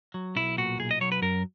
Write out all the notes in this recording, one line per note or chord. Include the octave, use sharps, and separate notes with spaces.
F#3
B1 E4
A#2 F#4
B1 G#4
D#5
F#3 C#5
B4
F#2 A#4